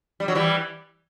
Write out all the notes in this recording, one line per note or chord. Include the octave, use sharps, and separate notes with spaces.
G3
F#3
E3 G3